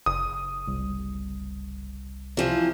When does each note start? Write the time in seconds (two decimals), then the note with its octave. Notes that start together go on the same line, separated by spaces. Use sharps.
0.06 F#1 D#6
0.68 C2
2.37 C3 E3 F3 E4